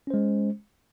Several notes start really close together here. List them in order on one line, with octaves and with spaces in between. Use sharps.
C#4 C5 G#3